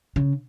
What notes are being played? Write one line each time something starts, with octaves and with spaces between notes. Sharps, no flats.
C#3